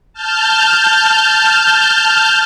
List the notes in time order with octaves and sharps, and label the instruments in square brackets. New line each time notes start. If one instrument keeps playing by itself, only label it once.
[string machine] A5 F6 G6